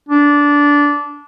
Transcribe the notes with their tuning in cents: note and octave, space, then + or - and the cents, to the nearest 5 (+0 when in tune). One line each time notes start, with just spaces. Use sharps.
D4 -15